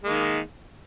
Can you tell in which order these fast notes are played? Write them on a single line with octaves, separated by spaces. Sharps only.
G#3 A#3 D#3